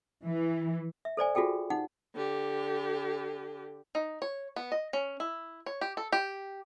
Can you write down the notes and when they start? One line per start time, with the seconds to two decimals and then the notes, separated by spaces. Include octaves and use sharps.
0.24 E3
1.05 E5
1.17 A4 C5 D5 G#5
1.35 F4 F#4 G#4 A4 G5
1.70 D#4 F#5
2.15 D3 G4
3.95 D#4
4.22 C#5
4.56 B3
4.72 D#5
4.93 C#4
5.20 E4
5.66 C#5
5.81 G4
5.97 A4
6.12 G4